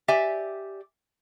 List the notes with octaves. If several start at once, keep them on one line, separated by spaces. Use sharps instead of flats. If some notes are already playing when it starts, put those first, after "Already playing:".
G4 D5 E5 G#5